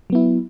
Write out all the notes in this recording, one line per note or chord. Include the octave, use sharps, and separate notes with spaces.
F#3 B3 E4